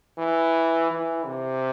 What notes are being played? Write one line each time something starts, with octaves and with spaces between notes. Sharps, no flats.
E3
E3
C3